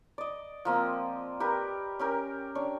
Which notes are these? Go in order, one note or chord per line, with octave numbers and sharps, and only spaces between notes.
D5 D#5
F3 A#3 C4
G4 A#4 B4
C#4 G4 A#4
D4 C#5